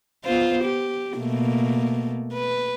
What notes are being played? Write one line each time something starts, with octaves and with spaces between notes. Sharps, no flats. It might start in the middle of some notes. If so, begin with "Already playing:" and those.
B3 F4 C5
G4
B2 A3 A#3
B4